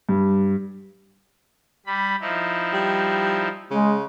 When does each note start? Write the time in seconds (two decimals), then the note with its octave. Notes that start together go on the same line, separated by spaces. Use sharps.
0.09 G2
1.86 G3 B5
2.21 F3 D#4 E4
2.74 G3
3.71 C#3 G#3